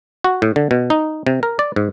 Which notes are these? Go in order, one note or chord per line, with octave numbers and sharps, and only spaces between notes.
F#4
A2
D3
B2
D#4
C3
A#4
D5
G#2